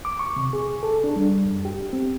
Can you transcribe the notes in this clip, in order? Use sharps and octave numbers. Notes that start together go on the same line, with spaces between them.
D6
C#6
C3
G#4
A4
D4
G3
F#2
G4
C4